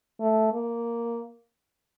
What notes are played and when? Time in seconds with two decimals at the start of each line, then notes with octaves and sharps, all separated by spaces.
0.20 A3
0.53 A#3